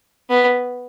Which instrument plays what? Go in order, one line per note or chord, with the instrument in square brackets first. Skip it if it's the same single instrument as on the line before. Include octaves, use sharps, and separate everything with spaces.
[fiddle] B3